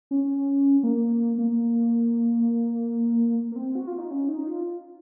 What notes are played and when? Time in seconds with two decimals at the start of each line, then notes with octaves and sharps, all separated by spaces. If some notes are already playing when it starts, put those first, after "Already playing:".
0.11 C#4
0.83 A#3
1.38 A#3
3.52 A#3
3.56 C4
3.75 F#4
3.87 F4
3.98 D#4
4.11 C#4
4.29 D#4
4.47 F4